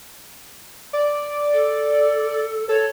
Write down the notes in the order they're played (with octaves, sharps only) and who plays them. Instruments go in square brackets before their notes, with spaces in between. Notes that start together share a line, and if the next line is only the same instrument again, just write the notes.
[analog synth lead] D5
[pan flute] A4
[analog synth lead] A4 [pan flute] C#5